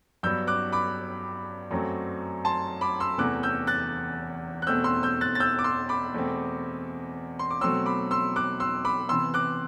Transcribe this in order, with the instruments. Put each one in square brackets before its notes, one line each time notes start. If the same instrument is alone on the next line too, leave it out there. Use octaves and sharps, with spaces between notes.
[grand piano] G2 F#3 B3 E6 G6
D6 F#6
B5 D6
F#2 F#3 A3 C4
A5 C6
B5 D6
C6 E6
E2 C3 E3 A3 D6 F#6
E6 G6
F#6 A6
F#6
E2 B2 A3 C4 E6 G6
C6 E6
E6 G6
F#6 A6
A6
E6 G6
D6
C6 E6
B5 D6
E2 B2 A3 C4
C6
D6
B2 F#3 A3 C4 C6 E6
B5 D6
C6 E6
D6 F#6
C6 E6
B5 D6
C3 E3 B3 C6 E6
D6 F#6